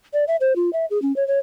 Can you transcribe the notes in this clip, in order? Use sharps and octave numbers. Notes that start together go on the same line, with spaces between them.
D5
E5
C5
F4
E5
G#4
C#4
C#5
C#5